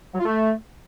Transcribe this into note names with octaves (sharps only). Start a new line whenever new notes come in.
F#3
F4
A3